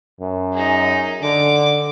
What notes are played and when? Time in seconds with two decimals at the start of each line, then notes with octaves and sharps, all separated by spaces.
0.21 F#2
0.54 D#4 G#4
1.22 D3 D6